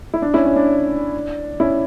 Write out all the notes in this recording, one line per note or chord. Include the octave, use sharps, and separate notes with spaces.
E4
D4
C#4 E4
C#4
D4
C#4 E4